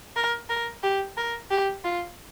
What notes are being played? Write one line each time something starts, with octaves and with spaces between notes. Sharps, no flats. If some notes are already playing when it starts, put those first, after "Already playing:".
A#4
A#4
G4
A#4
G4
F4